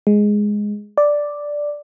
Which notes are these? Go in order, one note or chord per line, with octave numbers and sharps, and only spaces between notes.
G#3
D5